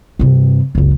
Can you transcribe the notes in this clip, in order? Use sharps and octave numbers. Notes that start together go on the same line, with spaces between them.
G2 C3
F#1 C#2